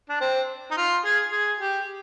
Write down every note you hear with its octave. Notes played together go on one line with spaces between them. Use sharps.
D4
C4
D#4
F4
G#4
G#4
G4